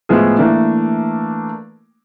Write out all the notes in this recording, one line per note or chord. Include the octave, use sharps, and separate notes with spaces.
A2 F3 G#3 B3 G#4
E3 A3 A#3 D4